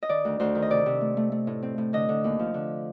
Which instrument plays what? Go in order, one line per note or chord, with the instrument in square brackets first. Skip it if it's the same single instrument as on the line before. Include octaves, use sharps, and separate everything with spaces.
[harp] D#5
D#3 D5
D2
D2 C5
D#3
D#5
C3 D5
C3
A3
A3
A3
A2
C4
A2
D3 D#5
D3
D#2
F3
D3